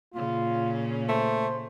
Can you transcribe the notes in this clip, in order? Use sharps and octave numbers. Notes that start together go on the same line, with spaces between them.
A#2 C#3 C#4 F4
A3 C5